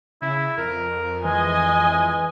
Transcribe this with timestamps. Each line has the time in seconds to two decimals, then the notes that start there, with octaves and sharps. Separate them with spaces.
0.22 C#3 E4
0.58 F2 A#4
1.25 E3 G#3 D#5 G#5